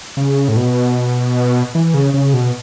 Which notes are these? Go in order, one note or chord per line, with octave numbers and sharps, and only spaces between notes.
C#3
A2
B2
E3
C#3
C#3
B2